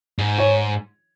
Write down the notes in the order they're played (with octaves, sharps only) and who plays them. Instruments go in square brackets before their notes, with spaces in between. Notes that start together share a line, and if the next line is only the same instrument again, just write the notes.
[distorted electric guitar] G#2
[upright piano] C#5